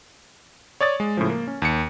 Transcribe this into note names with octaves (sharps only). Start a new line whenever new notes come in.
C#5 D5 D#6 A6
G#3
A2 C#3 F3
A#3
C#4
D#2 C#7